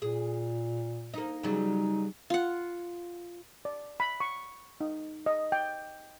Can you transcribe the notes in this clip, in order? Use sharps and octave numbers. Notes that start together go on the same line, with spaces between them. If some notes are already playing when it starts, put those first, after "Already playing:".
A#2 G#4
A#3 D#4
C#3 F#3 G3 D#4
F4 F#5
D5
B5
C#6
D#4
D#5
G5